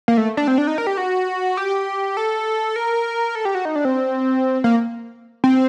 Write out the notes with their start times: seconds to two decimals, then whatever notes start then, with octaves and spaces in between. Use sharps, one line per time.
0.08 A#3
0.17 A3
0.37 D4
0.48 C4
0.58 D4
0.67 D#4
0.78 A#4
0.87 G4
0.97 F#4
1.57 G4
2.17 A4
2.76 A#4
3.35 A4
3.45 G4
3.55 F#4
3.65 D#4
3.76 D4
3.85 C4
4.64 A#3
5.44 C4